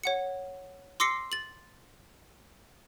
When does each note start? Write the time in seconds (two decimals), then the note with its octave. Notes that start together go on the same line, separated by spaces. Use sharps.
0.04 C#5 F#5 C#7
1.00 C6 D6 E6 A#6 C7 C#7
1.32 A6 F#7